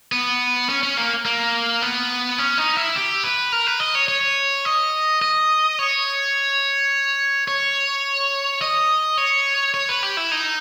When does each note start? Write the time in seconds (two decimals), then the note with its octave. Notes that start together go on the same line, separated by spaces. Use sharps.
0.12 B3
0.69 C#4
0.83 C#4
0.97 A#3
1.26 A#3
1.82 B3
2.38 C#4
2.58 D#4
2.76 E4
2.96 G4
3.24 B4
3.52 A#4
3.67 B4
3.80 D#5
3.95 C#5
4.08 C#5
4.65 D#5
5.22 D#5
5.79 C#5
7.48 C#5
8.62 D#5
9.18 C#5
9.74 C#5
9.89 B4
10.03 G4
10.17 E4
10.31 D#4